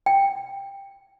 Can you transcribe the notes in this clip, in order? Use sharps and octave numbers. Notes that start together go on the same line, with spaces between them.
G5